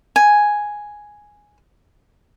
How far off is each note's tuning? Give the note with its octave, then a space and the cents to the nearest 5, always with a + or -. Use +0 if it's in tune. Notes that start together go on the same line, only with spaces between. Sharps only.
G#5 +0